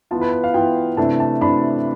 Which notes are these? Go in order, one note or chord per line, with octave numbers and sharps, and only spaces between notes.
E3 B3 F4 A5
B4
B4
F5
E3 B3 F4 G5
C3 E3 A3 D4 A5
A5
C3 E3 A3 D4 B5